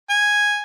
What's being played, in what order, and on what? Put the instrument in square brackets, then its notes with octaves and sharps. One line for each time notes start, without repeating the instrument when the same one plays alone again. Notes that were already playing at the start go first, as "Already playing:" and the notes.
[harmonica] G#5